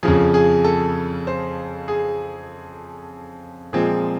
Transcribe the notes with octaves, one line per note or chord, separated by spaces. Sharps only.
F2 C#3 F3 G#4
G#4
A4
C5
G#4
A#2 F3 G#3 C4 G#4